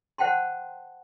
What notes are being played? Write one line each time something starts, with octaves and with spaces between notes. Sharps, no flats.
C5 F#5 G5 A5 C6